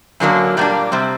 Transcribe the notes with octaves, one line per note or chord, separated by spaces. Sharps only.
F#2 D3 F#3 A#3 D4
A#2 G3 A#3 D4
C3 G3 C4